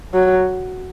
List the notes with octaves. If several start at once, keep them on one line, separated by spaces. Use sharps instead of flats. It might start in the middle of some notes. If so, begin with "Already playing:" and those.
F#3